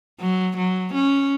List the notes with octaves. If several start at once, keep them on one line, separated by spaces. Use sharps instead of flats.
F#3
F#3
C#4